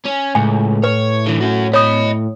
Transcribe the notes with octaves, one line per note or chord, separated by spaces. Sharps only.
C#4
C#2 A2 G#5
B4 C#5
D3 E3
C#4 F#4
C#5 D#5 B5 D#6